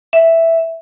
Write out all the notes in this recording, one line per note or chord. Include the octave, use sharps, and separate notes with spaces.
E5